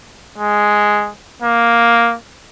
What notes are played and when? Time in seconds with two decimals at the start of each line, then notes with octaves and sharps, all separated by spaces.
0.38 G#3
1.42 A#3